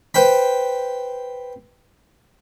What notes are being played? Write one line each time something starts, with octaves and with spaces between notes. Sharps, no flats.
B4 C5 G5 B5